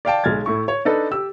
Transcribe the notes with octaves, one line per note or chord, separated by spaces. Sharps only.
D5 F5 G5 A5
B1 G#3 F6 G#6 A6
A2 E4 C#6
C#5
D4 D#4 A4 B4
G4 E6